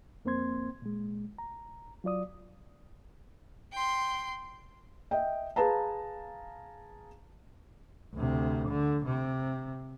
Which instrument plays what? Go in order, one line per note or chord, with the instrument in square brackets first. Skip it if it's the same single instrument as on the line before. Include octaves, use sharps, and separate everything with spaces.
[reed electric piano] F2 A#3 C4 C5 C6 G#6
A#2 G#3
A#5
F#3 F4 D5 D#6
[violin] G5 C6
[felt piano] D#5 E5 G5
G#4 B4 F5 A5 A#5
[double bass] D2 C3
D3
C3